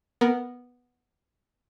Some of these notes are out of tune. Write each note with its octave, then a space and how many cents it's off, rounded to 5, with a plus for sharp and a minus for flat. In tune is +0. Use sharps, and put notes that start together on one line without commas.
B3 -5 A#4 +0